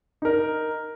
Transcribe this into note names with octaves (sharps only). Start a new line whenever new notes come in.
D#4 A#4